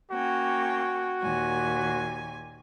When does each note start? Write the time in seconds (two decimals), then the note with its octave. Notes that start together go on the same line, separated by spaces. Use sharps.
0.11 A#3 C#4 F#4 G5
1.22 D#2 A#2 G#5